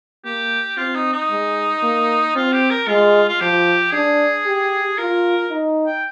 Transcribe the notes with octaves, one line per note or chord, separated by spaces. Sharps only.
A#3 G4
C4 F4
D#4
D#4
G#3
A#3
C4 F4
G4
A#4
G#3 F4
F4
F3 G4
D4 G#4
G4
F4 A#4
D#4
G5